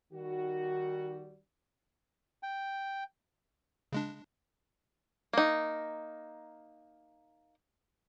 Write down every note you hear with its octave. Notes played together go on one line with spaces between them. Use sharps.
D#3 G3 F#4
G5
C#3 G#3 D4
A#3 D#4